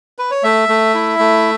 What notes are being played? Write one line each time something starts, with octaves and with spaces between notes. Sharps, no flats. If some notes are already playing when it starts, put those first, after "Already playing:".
B4
C#5
A3 E5
A3
E4
A3